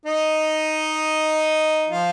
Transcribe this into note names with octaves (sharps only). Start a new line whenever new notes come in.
D#4 D#5
F3 F4